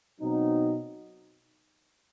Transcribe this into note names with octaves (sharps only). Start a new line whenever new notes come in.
B2 F#3 C4 D#4